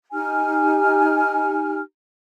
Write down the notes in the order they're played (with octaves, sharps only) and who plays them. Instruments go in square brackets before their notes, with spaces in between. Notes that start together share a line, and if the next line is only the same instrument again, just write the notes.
[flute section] D#4 G4 G#5 F6